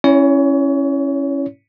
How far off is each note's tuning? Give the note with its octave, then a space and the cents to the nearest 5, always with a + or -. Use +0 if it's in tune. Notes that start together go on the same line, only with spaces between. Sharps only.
C#4 -10 E4 +0 C#5 +30